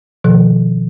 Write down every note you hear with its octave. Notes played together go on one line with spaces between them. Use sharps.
B2 D#3 F3